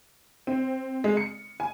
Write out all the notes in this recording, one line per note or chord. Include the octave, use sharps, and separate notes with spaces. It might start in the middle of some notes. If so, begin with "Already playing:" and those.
C4
G#3
C#7
G#5